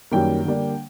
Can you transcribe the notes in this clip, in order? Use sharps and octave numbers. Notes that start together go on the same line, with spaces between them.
F#2 D#3 G3 A#3 G5
D3 G3 A#3 D4